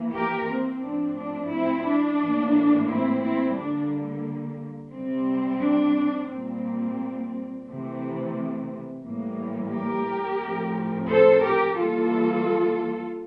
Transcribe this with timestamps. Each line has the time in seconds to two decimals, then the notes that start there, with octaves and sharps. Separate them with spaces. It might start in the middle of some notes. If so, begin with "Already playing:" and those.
Already playing: E3 A#3
0.14 G4 A#4
0.48 C4
0.82 A2 F3 C4 D4
1.18 D4
1.51 C4 E4
1.86 D4
2.20 A2 E3 A#3
2.88 C4 E4
3.22 C4 E4
3.56 D3 G3 A#3 D4
4.92 C3 G3 C4
5.61 D4
6.30 A#2 G3 A#3 C4
7.67 C3 E3 A3 C4
9.03 A2 E3 G3 A#3
9.71 G4 A#4
10.40 A2 F3 A3 C4
11.08 A4 C5
11.42 G4 A#4
11.76 E3 G3 A#3 F4 A4